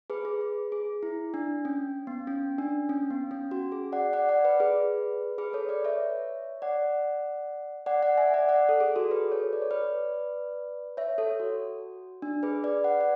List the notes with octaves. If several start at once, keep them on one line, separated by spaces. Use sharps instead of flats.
G#4 B4
G#4
G#4
G#4
E4
D4
C#4
B3
C#4
D4
C#4
B3
C#4
F#4
G#4
D5 F#5
D5 F#5
D5 F#5
B4 D5
G#4 B4
G#4 B4
A4 C#5
B4 D5
C#5 E5
D5 F#5
D5 F#5
D5 F#5
E5 G#5
D5 F#5
D5 F#5
A4
G#4
F#4 A4
G#4 B4
A4 C#5
D5
C#5
B4 D5
C#5 E5
A4 C#5
F#4
D4
G#4 B4
B4 D5
D5 F#5
D5 F#5